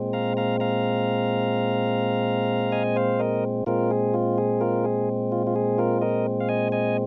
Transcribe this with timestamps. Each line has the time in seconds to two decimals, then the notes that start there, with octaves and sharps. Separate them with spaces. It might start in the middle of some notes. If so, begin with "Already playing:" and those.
Already playing: A#2 G#3 C4
0.13 F5 A#5
0.37 F5 A#5
0.60 F5 A#5
2.72 D#5 G#5
2.96 C5 F5
3.19 A#4 D#5
3.66 A#2 G#3 C4 F4 A#4
3.91 G#4
4.14 F4
4.38 G#4
4.61 F4 A#4
4.85 G#4
5.32 F4
5.47 F4
5.56 G#4
5.78 F4 A#4
6.02 A#4 D#5
6.40 F5
6.49 D#5 G#5
6.72 D#5 G#5